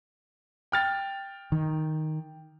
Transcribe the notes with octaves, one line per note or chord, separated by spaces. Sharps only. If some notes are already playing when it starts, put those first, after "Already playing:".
G5 F6 A6
D#3